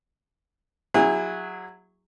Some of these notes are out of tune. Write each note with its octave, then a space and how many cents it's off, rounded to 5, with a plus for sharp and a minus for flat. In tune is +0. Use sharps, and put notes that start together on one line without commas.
F#3 -10 E4 +0 G#4 -30